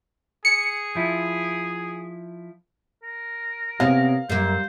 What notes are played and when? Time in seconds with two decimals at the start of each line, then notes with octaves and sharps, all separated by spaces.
0.45 G#4 C#7
0.95 F3 E4
3.03 A#4
3.80 C3 B3 C#4 F5
4.30 F#2 G3 A#3 C5